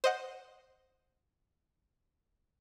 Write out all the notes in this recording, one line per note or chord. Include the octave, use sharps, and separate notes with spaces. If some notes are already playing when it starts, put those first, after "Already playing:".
C5 D#5 F#5